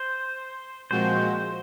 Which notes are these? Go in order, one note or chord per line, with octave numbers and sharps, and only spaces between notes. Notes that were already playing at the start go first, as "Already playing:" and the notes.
Already playing: C5
A#2 F3 G#3 C4 F#4 C5